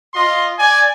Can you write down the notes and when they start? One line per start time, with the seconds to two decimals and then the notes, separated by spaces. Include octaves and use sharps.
0.14 F4 D#5 C6
0.59 D5 G#5